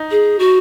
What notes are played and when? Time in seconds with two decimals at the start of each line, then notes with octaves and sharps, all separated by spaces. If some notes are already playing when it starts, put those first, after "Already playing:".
Already playing: D#4
0.11 G#4
0.39 F#4